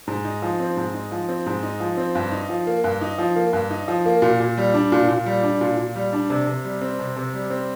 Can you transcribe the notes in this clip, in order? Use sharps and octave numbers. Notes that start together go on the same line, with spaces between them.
G#2
D#4
F3
C4
G#2
D#4
F3
C4
G#2
D#4
F3
C4
G2
D#4
F3
A#3
G2
D#4
F3
A#3
G2
D#4
F3
A#3
A#2
A#2
G3
D4
A#2
A#2
G3
D4
A#2
A#2
G3
D4
C3
C3
G3
C4
C3
C3
G3
C4